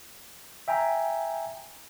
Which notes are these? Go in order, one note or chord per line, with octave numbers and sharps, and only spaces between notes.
E5 G5 G#5 A#5